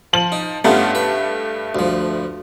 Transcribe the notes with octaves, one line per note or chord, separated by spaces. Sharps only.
F3 F#7
D#4
G2 A3 B3 C#4 F4
B4
D2 F3